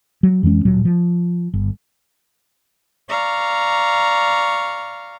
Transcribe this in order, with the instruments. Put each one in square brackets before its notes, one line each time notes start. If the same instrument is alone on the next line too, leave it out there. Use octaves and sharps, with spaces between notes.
[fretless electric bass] F#3
F2 E3 G#3 C#4
D1 A#2 F#3
F3
G1
[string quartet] D5 F5 A#5 C#6